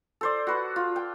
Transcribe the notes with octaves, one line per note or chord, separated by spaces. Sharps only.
A4 C5 D5
F#4 B4 F#5
F4
G5